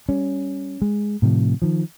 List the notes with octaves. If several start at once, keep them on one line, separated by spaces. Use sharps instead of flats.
G3 C#4
G#3
A2 C3 D#3 F3
D#3 F3